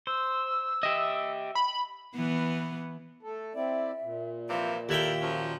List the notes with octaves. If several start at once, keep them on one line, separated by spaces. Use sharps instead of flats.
C5 E6
G4 D#5 E5
B5
E3 B3
A3 A4
C4 E4 D5 E5
A#2
C3 E3 F3 F5
D#2 E4 A4 A#4 E5 F5 G5
F3 F#3 C#4